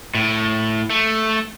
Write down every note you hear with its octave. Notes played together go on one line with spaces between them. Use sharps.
A2
A3